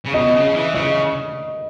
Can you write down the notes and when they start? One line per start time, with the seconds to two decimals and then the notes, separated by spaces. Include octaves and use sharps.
0.06 C#3
0.14 B2 D#5
0.35 C#3
0.54 E3
0.74 C#3 D#5